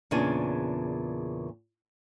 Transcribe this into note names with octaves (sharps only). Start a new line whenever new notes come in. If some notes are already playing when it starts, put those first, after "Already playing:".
E2 A#2 C#3 B3 D4 G#5